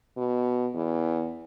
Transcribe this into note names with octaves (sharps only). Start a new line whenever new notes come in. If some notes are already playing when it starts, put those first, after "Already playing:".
B2
E2